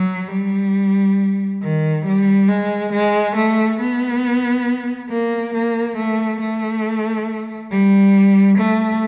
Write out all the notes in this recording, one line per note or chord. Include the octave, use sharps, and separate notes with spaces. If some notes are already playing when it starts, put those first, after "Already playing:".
Already playing: F#3
G3
D#3
G3
G#3
G#3
A3
B3
A#3
A#3
A3
A3
G3
A3